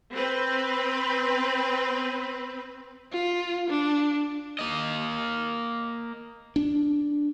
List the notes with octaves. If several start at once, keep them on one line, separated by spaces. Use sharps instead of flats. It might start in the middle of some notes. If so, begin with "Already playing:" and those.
C4 B4
F4
D4
A#3 D#5
D4